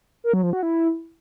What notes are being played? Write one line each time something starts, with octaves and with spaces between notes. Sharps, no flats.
A#4
F#3
F3
F#4
E4